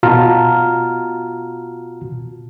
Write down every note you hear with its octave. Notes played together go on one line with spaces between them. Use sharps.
B2 F4 F#4 A5 A#5 F6